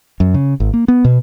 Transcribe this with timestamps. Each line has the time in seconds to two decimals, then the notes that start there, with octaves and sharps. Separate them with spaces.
0.20 F#2
0.34 C#3
0.60 G#1
0.74 A#3
0.88 B3
1.05 B2